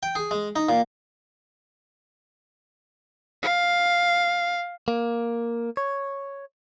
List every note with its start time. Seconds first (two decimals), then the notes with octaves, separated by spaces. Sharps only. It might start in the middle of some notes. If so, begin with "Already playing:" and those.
0.03 G5
0.15 G#4
0.31 G#3
0.56 D#4
0.69 A#2
3.42 F5
4.88 A#3
5.77 C#5